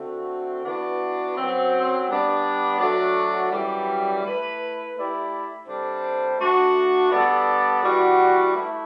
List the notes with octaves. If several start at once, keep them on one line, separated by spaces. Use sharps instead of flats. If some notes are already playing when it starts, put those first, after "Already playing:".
Already playing: D3 A3 C4 F#4
E3 B3 D4 F#4 B4
F#2 F#3 C4
G3 B3 D4
F#3 A3 D4 F#4
F#2 E3 G3
A3 E4 B4
A3 E4 G4 D5
C3 G3 D4 A4 C5
A3 D4 F#4
G3 B3 D4 A4 D5
E3 G3 D4 F#4
A3 E4